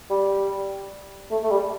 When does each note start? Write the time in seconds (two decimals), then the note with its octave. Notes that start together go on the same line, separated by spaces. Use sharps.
0.10 G3
1.31 A3
1.43 A3
1.51 G3